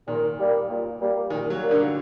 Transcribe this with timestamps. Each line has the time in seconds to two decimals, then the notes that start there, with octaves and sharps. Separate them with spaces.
0.07 A#2 D#3
0.39 G3 A#3
0.69 A#2
1.00 G3 A#3
1.30 A#2 D#3
1.50 F#3
1.61 G3 A#3
1.71 D3